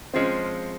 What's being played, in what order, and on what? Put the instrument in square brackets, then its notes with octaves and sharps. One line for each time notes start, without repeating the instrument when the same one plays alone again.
[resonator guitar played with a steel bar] F3 G#3 C#4 F4 [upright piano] C4